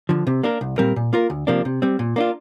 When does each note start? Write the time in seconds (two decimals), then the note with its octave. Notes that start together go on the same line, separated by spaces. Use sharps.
0.09 D3 F3
0.27 C3
0.43 A#3 D4 A#4
0.61 C2
0.78 A#2 G3 C4 A#4
0.96 A#2
1.13 A#3 F4 A#4
1.30 D2
1.47 C3 F3 A#3 D4
1.65 C3
1.82 G3 C4
1.99 A#2
2.16 A#3 D4 F4